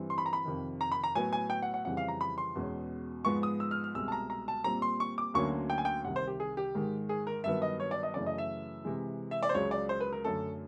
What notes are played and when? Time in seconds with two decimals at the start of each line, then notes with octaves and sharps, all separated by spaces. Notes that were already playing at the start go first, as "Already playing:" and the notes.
Already playing: G2 E3 G3 C4
0.10 C6
0.18 B5
0.26 A#5
0.33 B5
0.45 F2 C3 D#3
0.81 A#5
0.92 B5
1.04 A#5
1.15 A2 F#3 B3 G#5
1.33 G#5
1.50 G5
1.62 F#5
1.74 F#5
1.85 F2 C#3 E3 G3 F#5
1.97 F5
2.08 A#5
2.21 B5
2.38 C6
2.55 E2 B2 G#3 C#4
3.25 G#2 F3 G#3 B3 C#6
3.43 D#6
3.60 E6
3.71 F6
3.84 F6
3.95 C2 B2 G#3 E6
4.08 A5
4.12 A#5
4.30 A#5
4.48 A5
4.64 A#2 G3 C4 A#5
4.82 C6
5.00 C#6
5.18 D6
5.34 D2 D3 F#3 A#3 C#4 C#6
5.70 G5
5.78 G#5
5.85 G5
6.04 C2 C3 D#3 F#5
6.16 C5
6.27 G4
6.40 G#4
6.57 G4
6.75 G#2 D#3 G#3
7.09 G#4
7.27 A#4
7.44 G2 D#3 F#3 B3 E5
7.62 D#5
7.80 C#5
7.91 D5
8.03 D#5
8.14 F#2 C#3 E3 A3 D5
8.26 D#5
8.38 E5
8.85 C3 E3 G#3
9.31 E5
9.43 D5
9.49 C5
9.54 C#2 C#3 F#3 C#5
9.71 D5
9.89 C5
10.00 B4
10.13 A#4
10.24 F#2 D3 F#3 A3 C#4 A4